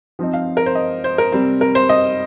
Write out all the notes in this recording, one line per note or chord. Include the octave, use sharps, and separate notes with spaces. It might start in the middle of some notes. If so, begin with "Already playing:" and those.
F3 C4 D#4
F5
A#4
C5
D#5
C5
A#4
C3 G3 C4
A#4
C5
D#5